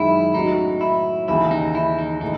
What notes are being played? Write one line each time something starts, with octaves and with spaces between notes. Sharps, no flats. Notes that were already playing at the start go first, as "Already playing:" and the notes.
Already playing: F#2 D#3 G#3 E4
A2 F#3 C#4 D#4 F#4
E4
D#2 C#3 E3 E4
D#4
E4
D#4
A2 E3 D#4